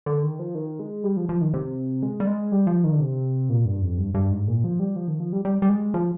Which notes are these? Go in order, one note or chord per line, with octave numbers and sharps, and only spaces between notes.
D3
D#3
F3
D#3
G#3
G3
F3
F3
D#3
C3
G#3
G3
G#3
G3
F3
D#3
D3
C3
A#2
G2
F2
G2
G2
G#2
A#2
F3
G3
F3
D#3
F3
G3
G3
G3
G#3
F3